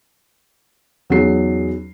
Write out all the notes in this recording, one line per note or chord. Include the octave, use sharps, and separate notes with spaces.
E2 F#3 C#4 D#4 G#4 C7